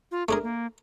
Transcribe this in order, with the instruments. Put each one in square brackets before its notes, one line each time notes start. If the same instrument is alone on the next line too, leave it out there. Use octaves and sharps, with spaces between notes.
[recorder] F4
[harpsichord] A3 D4 A#4 [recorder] G#4
[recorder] A#3